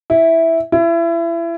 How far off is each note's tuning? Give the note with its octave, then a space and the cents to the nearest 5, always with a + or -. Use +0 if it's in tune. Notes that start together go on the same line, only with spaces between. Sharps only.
E4 -5
E4 +30